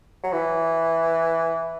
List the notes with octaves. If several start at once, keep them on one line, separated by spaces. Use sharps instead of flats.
F#3
E3